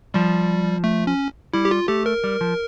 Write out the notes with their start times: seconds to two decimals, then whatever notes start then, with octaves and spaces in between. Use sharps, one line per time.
0.14 F3 G3
0.84 A3
1.07 C#4
1.54 G3 E4
1.65 G4
1.71 F4
1.88 A3 G4
2.06 A#4
2.24 G3
2.41 F3